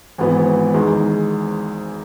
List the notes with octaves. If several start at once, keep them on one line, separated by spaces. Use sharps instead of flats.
G#1 G#2 E3 B3
E2 D#3 G#3